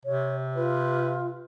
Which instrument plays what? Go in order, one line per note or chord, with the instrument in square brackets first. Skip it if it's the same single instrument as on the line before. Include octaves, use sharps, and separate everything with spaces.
[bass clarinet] C3 [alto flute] C#5
[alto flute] F4 [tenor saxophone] B4